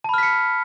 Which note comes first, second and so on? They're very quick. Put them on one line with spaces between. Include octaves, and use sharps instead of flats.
A5 B5 F6 B6 C#7